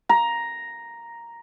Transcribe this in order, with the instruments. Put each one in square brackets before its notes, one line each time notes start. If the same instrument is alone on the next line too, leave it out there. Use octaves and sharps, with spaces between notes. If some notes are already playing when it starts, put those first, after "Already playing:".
[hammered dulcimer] A#5